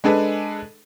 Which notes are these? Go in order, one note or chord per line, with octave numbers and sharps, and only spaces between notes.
G#3 D4 G#4 A4 B4